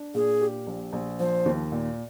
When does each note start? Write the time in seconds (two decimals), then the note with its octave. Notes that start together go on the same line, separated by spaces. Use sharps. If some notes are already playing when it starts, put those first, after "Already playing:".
Already playing: D4
0.15 A#2 G#4
0.41 G4
0.67 A#1
0.93 A#1
1.20 F3 C5
1.46 D#2
1.72 A#2